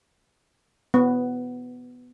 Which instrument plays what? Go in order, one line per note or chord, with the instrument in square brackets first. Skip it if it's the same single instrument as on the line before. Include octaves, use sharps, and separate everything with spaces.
[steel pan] B3